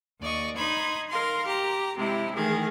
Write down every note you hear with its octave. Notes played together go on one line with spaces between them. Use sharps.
D#2 D5 D#5 C#6
D#4 B5 C6 G#6
A#4 F5 C6
G4 A#5
C3 G#3 E4 G4
D#3 E3 A3 G#4